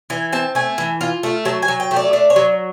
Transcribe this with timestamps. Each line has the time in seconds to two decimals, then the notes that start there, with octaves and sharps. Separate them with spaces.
0.10 E3 G#5
0.33 C4 A5
0.55 A3 G#5
0.78 E3
1.01 F4
1.23 A3
1.45 F#3 A5
1.62 G#5
1.68 F#3
1.80 G5
1.91 A3
1.96 D5
2.13 D4 D5
2.30 C#5
2.36 F#3